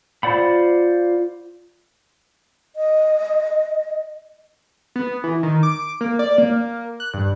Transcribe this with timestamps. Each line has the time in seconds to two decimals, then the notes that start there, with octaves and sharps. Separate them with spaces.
0.23 F4 C5 D5 F#5 B5
2.75 D#5
4.96 B3
5.24 E3
5.43 D#3
5.63 D6
6.01 A#3
6.19 D5
6.38 A#3
7.00 F#6
7.14 G2